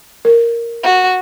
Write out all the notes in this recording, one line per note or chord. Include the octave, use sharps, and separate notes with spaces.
A#4
F#4